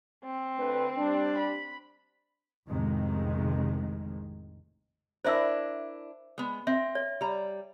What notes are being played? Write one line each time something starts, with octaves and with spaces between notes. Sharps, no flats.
C4
D2 B4
G3 D4
B5
A1 F2 C3 D#3 G#3
D4 E4 A#4 C5 E5 E6
G#3 B3
C4 E5
C#5
G3 A#5